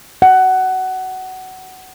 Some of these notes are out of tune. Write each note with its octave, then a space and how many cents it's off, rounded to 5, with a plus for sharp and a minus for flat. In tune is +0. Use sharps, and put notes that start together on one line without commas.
F#5 +15